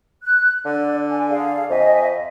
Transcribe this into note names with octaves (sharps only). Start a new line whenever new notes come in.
F#6
D3 D5
G#5
G#4 D5 F5
F2 D#5 E5 G#5